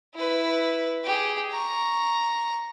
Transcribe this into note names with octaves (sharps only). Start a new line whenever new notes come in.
E4 B4
G4 G#4
A#5 C#6